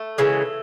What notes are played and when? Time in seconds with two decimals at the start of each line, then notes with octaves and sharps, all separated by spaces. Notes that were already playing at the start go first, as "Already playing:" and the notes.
Already playing: A3
0.18 C#3 E3 G#3